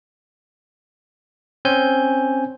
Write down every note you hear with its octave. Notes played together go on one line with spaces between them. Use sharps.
C4 C#4 G#5 G6